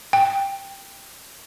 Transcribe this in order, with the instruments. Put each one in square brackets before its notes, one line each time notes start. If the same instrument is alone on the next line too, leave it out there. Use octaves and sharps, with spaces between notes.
[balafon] G5